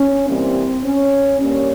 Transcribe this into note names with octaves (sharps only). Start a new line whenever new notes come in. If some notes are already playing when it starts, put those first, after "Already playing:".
Already playing: C#4
C3 E3 G3 A#3 C4
C#4
G2 G3 A#3 C#4